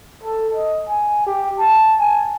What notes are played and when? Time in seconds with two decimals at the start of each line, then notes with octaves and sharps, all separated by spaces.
0.24 A4
0.55 D#5
0.88 G#5
1.27 G4
1.59 A5
2.00 G#5